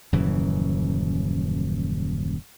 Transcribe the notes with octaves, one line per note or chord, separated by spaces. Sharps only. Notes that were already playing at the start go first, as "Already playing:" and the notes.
D#1 F#2 C#3 E3